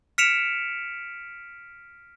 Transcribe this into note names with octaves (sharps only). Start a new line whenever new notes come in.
F6 B6 C#7 D7 E7 F7